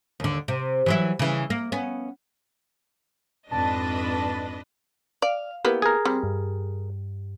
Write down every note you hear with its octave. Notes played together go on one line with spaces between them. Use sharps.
D#2 D3
C3
E3 F#3 E4
C#3 E3
A#3
B3 C#4
F2 G#2 D4 B4 D#5 A5
D5 F5
A#3 B3 E4 G4
G#4 A#4
G3 C4
G2